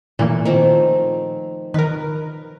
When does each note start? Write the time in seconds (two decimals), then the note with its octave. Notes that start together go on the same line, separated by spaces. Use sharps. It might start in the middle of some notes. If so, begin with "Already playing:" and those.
0.19 A#2 E3 A3 A#3
0.45 D#3 F3 C4
1.74 D#3 A#4 B4